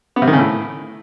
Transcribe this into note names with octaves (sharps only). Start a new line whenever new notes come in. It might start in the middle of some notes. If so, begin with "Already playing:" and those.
B3
C3
D#3
C#3
A2